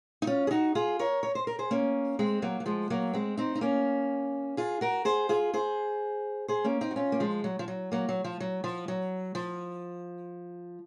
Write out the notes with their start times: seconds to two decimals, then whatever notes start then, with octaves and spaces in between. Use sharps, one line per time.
0.22 D#4
0.27 C#4 F4
0.47 G#4
0.51 D#4 F#4
0.75 F4 G#4
0.99 A#4 C#5
1.23 C#5
1.35 C5
1.47 A#4
1.59 G#4 C5
1.71 A#3 C#4
2.19 G#3 C4
2.42 F#3 A#3
2.60 F#3
2.66 F3 G#3
2.90 F#3 A#3
3.13 G#3 C4
3.38 C4 D#4
3.55 D#4
3.61 A#3 C#4
4.57 F4 G#4
4.81 F#4 A#4
5.05 G#4 C5
5.29 F4 G#4
5.54 G#4 C5
6.48 G#4 C5
6.64 A#3 C#4
6.81 C4 D#4
6.91 F#4
6.96 C#4 F4
7.12 A#3
7.20 F3 G#3
7.44 F#3
7.59 F3
7.68 F#3
7.92 F#3 A#3
8.09 F#3
8.24 F3
8.40 F#3
8.64 F3
8.88 F#3
9.35 F3